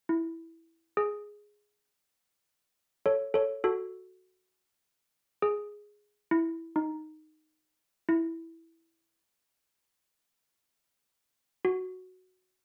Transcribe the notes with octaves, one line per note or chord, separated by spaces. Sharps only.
E4
G#4
A4 C#5
A4 C#5
F#4 A4
G#4
E4
D#4
E4
F#4